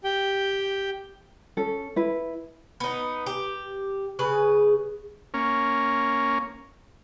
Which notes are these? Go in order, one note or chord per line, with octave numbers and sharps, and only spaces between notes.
G4 G5
C#4 A4
E4 B4
B3 D#4
G4
C#3 G#4 B4
A#3 C#4